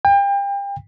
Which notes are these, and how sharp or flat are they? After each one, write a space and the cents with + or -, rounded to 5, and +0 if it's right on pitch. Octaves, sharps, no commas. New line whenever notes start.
G5 +35